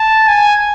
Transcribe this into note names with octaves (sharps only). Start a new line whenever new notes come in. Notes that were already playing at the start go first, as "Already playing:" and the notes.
Already playing: A5
G#5